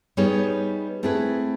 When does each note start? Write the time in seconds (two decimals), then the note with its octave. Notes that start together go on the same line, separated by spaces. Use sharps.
0.17 G3 B3 D#4 G#4 C#5
1.03 A3 C4 E4 G#4 B4